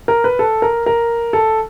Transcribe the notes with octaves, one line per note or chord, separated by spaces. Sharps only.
A#4
B4
A4
A#4
A#4
A4